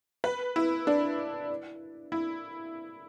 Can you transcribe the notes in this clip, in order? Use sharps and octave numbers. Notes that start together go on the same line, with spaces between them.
B4
E4
D4
E4